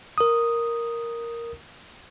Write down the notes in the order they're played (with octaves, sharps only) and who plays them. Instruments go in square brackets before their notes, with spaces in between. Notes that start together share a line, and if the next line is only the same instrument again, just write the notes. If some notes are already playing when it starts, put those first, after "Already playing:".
[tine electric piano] A#4 D#6